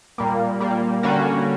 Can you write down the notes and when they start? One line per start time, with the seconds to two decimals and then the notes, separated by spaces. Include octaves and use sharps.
0.18 A#2 G3 A#3
0.60 A#2 G3 A#3
1.03 D3 G3 A#3 C#4 F#4